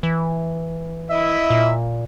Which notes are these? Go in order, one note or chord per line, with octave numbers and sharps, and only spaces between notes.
E3
E4 D#5 E5
A#2